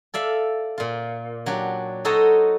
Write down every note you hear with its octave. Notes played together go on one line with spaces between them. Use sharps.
A4 D5 E5 F5
A#2 F4
F#3 D4 G4
D#4 F#4 A4 C5 C#5 D#5